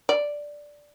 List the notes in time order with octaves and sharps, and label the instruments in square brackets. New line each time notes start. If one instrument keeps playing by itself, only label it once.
[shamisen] D5